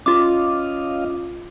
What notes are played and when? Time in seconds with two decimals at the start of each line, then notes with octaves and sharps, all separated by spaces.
0.06 C#4 F4 D#5 F5 D6